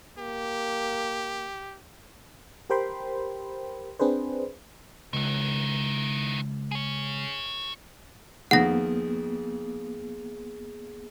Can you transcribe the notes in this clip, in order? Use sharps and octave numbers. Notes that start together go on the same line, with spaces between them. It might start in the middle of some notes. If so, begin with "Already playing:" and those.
A#3 G4
G4 A#4 C5 G5 B5 C6
C4 D4 G#4 B4 C5
C#2 D#3 E3
G#4 C#5
F2 D#3 A#3 B3 G#4 F#5 A#6